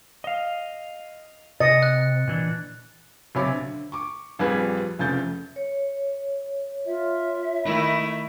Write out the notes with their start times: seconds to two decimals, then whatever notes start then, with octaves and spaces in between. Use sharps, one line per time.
0.24 D#5 F5
1.60 C3 D#5 A6 C#7
1.83 F#6
2.27 A#2 E3 D4
3.35 F#1 B1 C3 C#5 B5 D6
3.51 D3
3.92 C#6 D6
4.39 A#1 F2 G3 G#4 B4 G#6
4.99 F1 F2 C#3 A3 G6 A6
5.56 C#5
6.86 F4 E5
7.65 D#3 A3 E4 B5